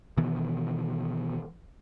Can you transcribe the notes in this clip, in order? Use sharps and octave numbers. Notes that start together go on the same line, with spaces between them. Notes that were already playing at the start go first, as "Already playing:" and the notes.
B2 D#3 E3 B3